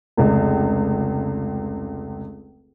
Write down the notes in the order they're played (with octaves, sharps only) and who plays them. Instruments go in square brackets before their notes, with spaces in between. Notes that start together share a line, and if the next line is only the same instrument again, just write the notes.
[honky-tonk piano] F1 C#2